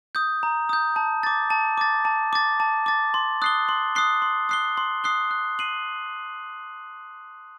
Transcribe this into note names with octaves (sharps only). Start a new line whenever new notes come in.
D#6 G6
A#5
D#6 G6
A5
D6 A6
A5
D6 A6
A5
D6 A6
A5
D6 A6
C6
D#6 F#6 C7 G7
C6
D#6 F#6 C7 G7
C6
D#6 F#6 C7 G7
C6
D#6 F#6 C7 G7
F#6
C7 D#7 F#7